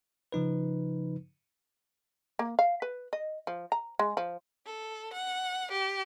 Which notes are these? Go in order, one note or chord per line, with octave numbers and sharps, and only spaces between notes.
C#3 F3 D#4 B4
A#3
F5
B4
D#5
F3
A#5
G#3
F3
A4
F#5
G4